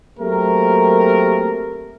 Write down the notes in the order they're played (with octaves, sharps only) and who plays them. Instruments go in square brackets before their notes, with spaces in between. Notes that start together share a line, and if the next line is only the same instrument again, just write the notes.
[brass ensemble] F#3 A3 A#3 C4 G4 A#4